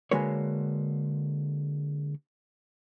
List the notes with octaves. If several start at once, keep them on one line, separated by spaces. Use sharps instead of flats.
D3 G#3 A#3 F#4 B4 C#5